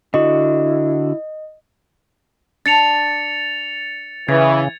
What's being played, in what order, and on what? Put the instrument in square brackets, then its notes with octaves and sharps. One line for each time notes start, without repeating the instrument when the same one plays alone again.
[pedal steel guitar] D3 F#4 [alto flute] E4 [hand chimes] D#5
[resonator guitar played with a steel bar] D4 [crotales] A6 C#7 F7
[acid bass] C#3 [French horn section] E3 [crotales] G#6